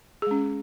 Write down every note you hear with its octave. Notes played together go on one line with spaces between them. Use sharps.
G#3 C#4 G#4